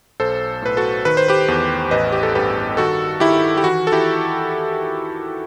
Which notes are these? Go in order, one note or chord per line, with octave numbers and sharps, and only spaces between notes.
B1 A4 C5
A2 B4
F#4 A4
D#3 B4
C5
G4 B4
E2
A1 B4 D#5
G4
A4
G2 G4 B4
D#3 F#4 A4
D#3 E4 G4
G4
E3 F#4
A4
E4 G4